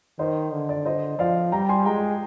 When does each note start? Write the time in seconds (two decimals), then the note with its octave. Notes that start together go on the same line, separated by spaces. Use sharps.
0.19 D#3 C5 D#5
0.53 D3
0.69 D5
0.85 C5 D#5
1.19 F3 D5 F5
1.52 G3 G5 A#5
1.69 G#5 C6
1.85 G#3 G5 A#5